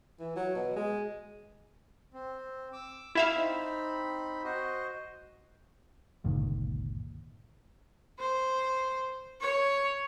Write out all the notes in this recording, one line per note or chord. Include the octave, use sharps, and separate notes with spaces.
E3
F#3
B2
G#3
C4
D6 E6
E4 E5 F5
C4 D#4 B5
F#4 C5 D#5
G1 C#2 A#2 D#3
C5
C#5